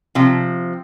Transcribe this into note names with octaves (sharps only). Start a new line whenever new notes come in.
C3 F3